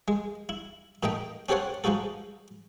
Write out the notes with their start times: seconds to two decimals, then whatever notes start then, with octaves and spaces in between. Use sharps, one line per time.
0.08 G#3
0.49 E4
1.03 A#2 A3 D#4 D#5 G5
1.49 C#4 G4 A4 C5 C#5 F#5
1.84 F3 G#3 D#4 F#4 A4